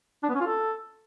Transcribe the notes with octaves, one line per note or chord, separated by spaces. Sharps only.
D4
B3
C#4
F4
A4